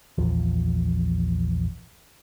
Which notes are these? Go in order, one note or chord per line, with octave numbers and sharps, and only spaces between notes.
A#1 E2 F3